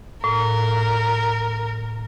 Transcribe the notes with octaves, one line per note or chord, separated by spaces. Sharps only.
A2 A#4